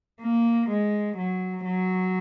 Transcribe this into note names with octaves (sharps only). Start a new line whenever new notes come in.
A#3
G#3
F#3
F#3